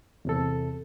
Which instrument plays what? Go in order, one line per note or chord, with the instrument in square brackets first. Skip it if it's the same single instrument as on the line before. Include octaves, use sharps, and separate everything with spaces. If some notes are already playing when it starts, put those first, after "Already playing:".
[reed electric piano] E2 C3 A4